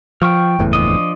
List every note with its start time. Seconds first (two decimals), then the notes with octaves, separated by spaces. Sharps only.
0.22 F3 G5 C#6 F6
0.59 F#1 E2 A2
0.73 F3 D4 D#5